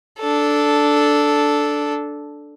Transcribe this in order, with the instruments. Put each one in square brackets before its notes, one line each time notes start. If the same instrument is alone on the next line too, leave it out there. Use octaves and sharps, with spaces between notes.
[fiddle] D4 A4